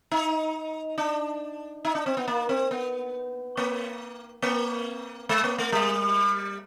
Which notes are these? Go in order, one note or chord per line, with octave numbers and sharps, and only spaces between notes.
D#4
D4
D#4
D4
C4
B3
A#3
C4
B3
A#3
A#3
G#3
A#3
A3
G3